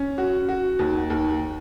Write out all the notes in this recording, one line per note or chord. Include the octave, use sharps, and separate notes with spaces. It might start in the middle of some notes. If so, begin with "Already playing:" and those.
Already playing: C#4
F#4
F#4
D#2
D#2